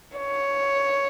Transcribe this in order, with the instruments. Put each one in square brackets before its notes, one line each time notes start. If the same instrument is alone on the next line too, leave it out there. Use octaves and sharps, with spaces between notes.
[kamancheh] C#5